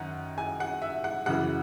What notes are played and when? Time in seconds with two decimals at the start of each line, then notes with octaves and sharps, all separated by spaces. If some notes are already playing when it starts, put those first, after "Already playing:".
Already playing: F#2 D#3 F#5
0.38 G#5
0.60 F#5
0.82 E5
1.04 F#5
1.26 F#2 C#3 E3 F#5